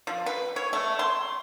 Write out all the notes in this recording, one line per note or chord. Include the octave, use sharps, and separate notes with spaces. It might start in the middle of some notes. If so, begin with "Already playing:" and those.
F3
B4
C#5
A3
C6